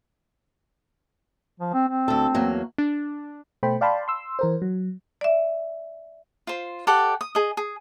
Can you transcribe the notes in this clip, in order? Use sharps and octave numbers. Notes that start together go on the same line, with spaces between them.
F3
C4
C4
D2 A4
E2 F#3 A#3
D4
B2 A3 C5 G5 B5
D5 F5 G5 A5 B5 C6
C6 E6
E3 A#4 C5
F#3
D5 E5
F4 C5
G4 A4 D5 F#5
D#6
G#4 D#5
G#4